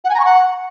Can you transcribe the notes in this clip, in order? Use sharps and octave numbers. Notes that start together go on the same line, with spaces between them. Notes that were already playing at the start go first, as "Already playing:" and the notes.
F#5
G#5
A#5
C#6
F#5